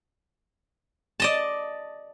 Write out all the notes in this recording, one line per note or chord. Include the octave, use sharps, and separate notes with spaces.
D5 D#5 A5